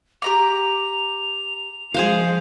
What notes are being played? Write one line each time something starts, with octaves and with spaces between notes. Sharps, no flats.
G4 A#5 D6 F7
F3 G#3 G#4 C5 F5